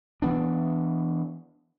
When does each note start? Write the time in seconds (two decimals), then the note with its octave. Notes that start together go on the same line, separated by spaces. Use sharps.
0.22 E3 B3 D4